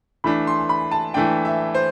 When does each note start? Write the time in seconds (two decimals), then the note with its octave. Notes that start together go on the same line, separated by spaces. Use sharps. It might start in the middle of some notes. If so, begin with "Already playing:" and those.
0.24 E3 A3 D4 B5
0.47 C6
0.69 B5
0.92 A5
1.14 E3 A3 D4 G5
1.45 E5
1.75 C5